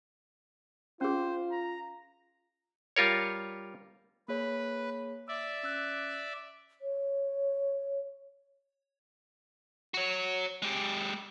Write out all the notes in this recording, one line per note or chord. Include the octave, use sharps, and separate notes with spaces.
C#4 F4 G#4 C5
A#5
G3 F4 A#4 C#5
A#3 G#4 B4 C#5
D5 E5 E6
C#4 E6 F#6
C#5
F#4 C#5
G#3 G4